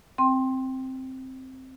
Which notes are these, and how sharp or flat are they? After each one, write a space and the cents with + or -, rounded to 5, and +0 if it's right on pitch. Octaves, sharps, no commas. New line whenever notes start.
C4 +0 G5 +0 C6 +15